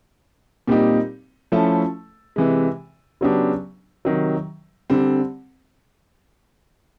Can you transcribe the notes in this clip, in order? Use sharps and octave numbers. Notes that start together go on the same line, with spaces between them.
A#2 G3 C4 D#4 G4
F3 A3 C#4 E4 A4
C3 E3 G#3
C#3 F#3 B3 D4 G4
C3 D#3 F#3
D3 G3 C4